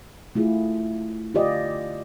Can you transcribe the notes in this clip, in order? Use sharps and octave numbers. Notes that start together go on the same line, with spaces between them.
A3 E4 F4 G#4
D3 F4 G4 D5 D#5